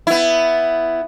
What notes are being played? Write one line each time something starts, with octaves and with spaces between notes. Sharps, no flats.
B3 E4